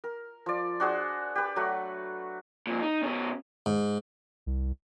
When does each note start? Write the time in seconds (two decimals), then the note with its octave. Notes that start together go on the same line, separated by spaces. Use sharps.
0.04 A#4
0.46 F3 D5
0.80 D4 F#4 G#4 C5
1.35 G4 B4
1.56 F#3 A3 F#4
2.67 F2 A#2
2.82 D#4
3.03 B2 C#4
3.66 G#2
4.46 C2